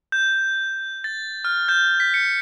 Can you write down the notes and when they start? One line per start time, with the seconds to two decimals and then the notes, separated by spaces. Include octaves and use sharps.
0.12 G6
1.04 A6
1.45 F6
1.68 G6
2.00 B6
2.14 C#7